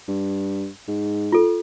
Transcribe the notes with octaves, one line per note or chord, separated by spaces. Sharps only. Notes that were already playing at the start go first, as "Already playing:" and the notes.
G2
G#2
F4 A4